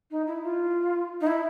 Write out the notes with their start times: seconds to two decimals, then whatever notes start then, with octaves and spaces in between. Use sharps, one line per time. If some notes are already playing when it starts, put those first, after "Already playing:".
0.11 D#4
0.27 E4
0.44 F4
1.21 D#4
1.27 E4